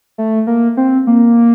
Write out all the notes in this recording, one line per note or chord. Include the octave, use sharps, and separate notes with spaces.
A3
A#3
C4
A#3